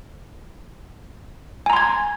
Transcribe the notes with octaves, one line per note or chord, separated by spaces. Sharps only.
G#5 A#5 C6 G#6